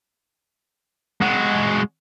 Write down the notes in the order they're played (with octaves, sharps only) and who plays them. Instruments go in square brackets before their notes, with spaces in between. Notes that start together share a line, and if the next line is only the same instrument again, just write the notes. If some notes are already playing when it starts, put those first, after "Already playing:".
[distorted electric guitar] G#3 F#4